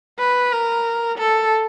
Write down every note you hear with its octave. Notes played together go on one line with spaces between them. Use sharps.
B4
A#4
A4